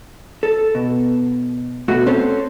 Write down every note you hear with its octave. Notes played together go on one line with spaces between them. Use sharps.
A4
B2
B2 A3 F#4
C4 C#4 A4 C5